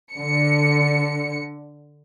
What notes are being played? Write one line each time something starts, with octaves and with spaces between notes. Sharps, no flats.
D3 C#7